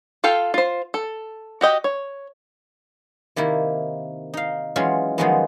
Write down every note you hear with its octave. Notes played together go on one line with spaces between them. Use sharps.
F4 A4 F5 G5
F4 C5
A4
F#4 G4 D#5 G5
C#5
C3 D#3 A#3 E4
D#4 F5
E3 F#3 G#3 C#4 F4
D#3 F3 F#3 G#3 A3 B3